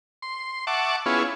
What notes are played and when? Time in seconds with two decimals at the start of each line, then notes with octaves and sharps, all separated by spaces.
0.22 C6
0.67 E5 F#5 A5 C#6 D6
1.06 B3 C#4 E4 F4 G#4